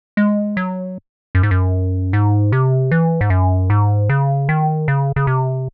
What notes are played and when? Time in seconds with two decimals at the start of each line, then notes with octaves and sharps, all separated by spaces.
0.17 G#3
0.57 F#3
1.35 F#2
1.43 G#2
1.51 F#2
2.13 G#2
2.52 C3
2.91 E3
3.21 G#2
3.30 F#2
3.70 G#2
4.09 C#3
4.49 D#3
4.88 C#3
5.16 C#3
5.27 C3